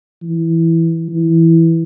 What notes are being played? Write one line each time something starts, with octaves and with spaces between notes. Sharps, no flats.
E3
E3